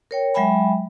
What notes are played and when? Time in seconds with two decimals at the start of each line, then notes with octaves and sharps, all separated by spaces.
0.11 A#4 C#5 G5
0.34 F#3 G#3 E5 G5 G#5 B5